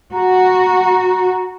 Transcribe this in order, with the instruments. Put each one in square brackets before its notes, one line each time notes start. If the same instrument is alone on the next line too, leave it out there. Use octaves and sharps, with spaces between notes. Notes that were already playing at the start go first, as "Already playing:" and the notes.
[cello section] F#4 [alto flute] A#5